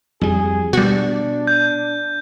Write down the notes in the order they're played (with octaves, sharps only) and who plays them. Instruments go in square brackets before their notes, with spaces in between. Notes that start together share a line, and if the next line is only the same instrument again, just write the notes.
[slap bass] F2 G3 [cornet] G#4
[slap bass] B2 [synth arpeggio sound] G3 F#4 [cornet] D4
[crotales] G6